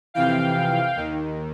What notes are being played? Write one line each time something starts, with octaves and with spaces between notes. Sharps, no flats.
F2 C3 E3 F5 G5
D#2 D#3